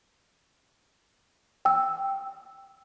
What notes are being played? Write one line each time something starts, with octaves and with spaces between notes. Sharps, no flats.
G5 E6